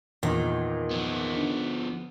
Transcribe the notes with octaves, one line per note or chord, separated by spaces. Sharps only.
E2 A#2 D#3
F3 B3
D3